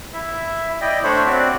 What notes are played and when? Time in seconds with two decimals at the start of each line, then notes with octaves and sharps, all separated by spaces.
0.13 E4 E5
0.69 E5
0.81 E4 D5 D#5 G5
1.04 A3 D4 C5 C#5 B5
1.26 C4 F#4 D5